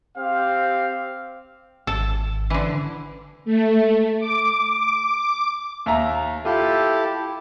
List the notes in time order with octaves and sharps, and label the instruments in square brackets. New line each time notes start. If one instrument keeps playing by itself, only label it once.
[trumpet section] C4 G4 F5
[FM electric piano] G#1 [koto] A4
[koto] D3 E3
[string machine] A3
D6
[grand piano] D#2 E5 A#5
[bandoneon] E4 G4 A4 [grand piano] F4